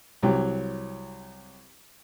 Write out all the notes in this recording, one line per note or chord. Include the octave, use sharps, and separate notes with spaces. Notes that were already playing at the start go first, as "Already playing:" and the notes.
C2 F#3 G4